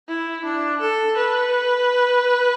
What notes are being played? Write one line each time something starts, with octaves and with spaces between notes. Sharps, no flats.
E4
D4
A4
B4